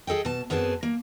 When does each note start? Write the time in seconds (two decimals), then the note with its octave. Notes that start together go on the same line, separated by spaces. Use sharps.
0.07 G#4 A4 D#5 G5
0.25 B2 A5
0.50 F#2 B3 C4 G#4 A5
0.83 A#3